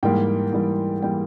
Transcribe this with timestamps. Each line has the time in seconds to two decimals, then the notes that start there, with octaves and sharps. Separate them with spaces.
0.03 G#2 E3 G3 A#3 G5
0.52 G#2 E3 G3 A#3
1.02 E3 G3 A#3 G5